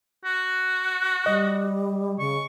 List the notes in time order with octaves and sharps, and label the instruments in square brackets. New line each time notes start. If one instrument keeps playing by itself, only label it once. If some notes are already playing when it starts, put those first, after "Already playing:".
[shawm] F#4
[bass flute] G3 [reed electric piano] D#5
[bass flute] C#3 [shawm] C#6